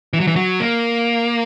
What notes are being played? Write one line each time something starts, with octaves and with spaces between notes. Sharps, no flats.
E3
F#3
E3
F#3
A#3